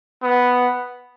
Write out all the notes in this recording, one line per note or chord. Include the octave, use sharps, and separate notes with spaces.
B3